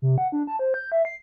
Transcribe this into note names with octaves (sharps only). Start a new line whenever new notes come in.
C3
F#5
D4
A5
C5
G6
E5
C7